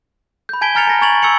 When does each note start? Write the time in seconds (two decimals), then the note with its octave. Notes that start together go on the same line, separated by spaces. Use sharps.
0.49 B5 G6
0.61 G#5 A5 G#6 B6 D7 G7
0.75 G#5 A#5 F6 A6 C#7 F7
0.87 G#5 A#6
1.01 G#5 C#6 G#6 A6 F7 F#7
1.22 C#6 E6 G#6 C#7 F7